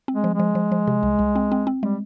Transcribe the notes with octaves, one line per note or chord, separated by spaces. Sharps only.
C4
G#3
F3
G#3
F3
F3
F3
C3
C2
C2
C4
C4
C4
G3 G#3